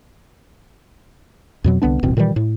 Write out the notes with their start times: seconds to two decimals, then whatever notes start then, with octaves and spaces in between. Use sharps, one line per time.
1.64 F2 B2 F#3
1.82 C2 D3 B3 D4
2.03 D#1 A1 B2 C4
2.17 A#2 D#3 E3 G3
2.36 A2